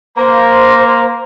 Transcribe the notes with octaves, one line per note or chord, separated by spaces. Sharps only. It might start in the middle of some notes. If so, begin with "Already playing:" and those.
A#3 C5 A#5